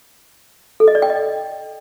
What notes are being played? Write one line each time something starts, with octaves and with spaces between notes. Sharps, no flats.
A4
D#5
D5
G5
D#5